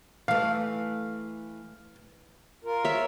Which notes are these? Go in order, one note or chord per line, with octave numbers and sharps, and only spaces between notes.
E3 A3 F5
F4 A#4
C#5 E5